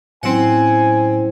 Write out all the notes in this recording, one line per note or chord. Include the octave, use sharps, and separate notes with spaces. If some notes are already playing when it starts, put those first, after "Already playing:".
A2 F#3 C4 C#4 E4 C5 F#5 G#5